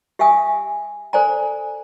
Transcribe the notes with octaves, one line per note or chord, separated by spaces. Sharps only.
G4 E5 F5 G#5 D#6
A4 C5 D5 G#5 A#5